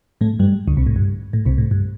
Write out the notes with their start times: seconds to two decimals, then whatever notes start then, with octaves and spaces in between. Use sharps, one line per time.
0.21 A2 A3
0.39 G2 G3
0.67 D2 D3
0.77 C2 C3
0.86 A2
0.96 G2
1.33 A2
1.45 C2 C3
1.58 A2
1.71 G2